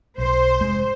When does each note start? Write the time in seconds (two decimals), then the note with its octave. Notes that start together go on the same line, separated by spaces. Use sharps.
0.18 B1 C5
0.61 F1 G#2 G#3